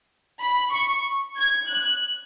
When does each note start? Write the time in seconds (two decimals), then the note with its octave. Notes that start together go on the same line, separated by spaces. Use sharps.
0.40 B5
0.72 C#6
1.36 G#6
1.68 F#6